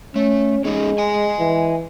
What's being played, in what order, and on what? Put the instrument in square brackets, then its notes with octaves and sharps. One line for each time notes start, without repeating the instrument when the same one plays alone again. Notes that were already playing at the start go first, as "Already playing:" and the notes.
[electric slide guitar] A3 [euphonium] C#4
[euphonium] G#3 [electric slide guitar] C#4 D#4 G#4
[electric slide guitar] D#5 G#5
[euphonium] E3